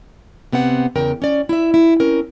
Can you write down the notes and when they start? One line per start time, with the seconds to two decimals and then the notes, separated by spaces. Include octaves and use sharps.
0.52 C3 B3 C4 F#5
0.95 E2 C#3 A#4 G5
1.22 C#4 D5
1.49 E4 E5
1.74 E4
2.00 C4 C#4 A#4